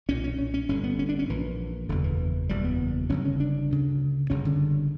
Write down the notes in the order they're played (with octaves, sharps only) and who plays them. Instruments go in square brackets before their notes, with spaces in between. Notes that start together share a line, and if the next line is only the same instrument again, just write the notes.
[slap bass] B1 A#2 C#4
C#4
C#4
C#4
G1 G2 D3 C#4
B3
C#4
D4
C#4
A#1 A#2 E3
F#1 E2 B2 D3
E3
F#1 E2 B2 G3
B3
G1 F#2 C#3 C#4
C#4
D4
D2 C#3
G1 F#2 C#3 C#4
D3